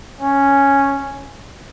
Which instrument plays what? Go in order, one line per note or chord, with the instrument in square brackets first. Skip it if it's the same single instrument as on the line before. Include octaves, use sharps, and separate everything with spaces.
[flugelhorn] C#4